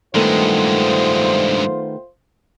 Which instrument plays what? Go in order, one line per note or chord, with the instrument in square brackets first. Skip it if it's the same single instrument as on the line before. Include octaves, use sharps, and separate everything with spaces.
[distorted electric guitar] G2 G#3 [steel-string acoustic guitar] D#3 A3 B3 [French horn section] F4 C5